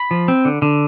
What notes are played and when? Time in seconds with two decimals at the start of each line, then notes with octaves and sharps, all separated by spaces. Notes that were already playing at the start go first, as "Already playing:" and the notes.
Already playing: B5
0.11 F3
0.28 C4
0.45 D3
0.62 D3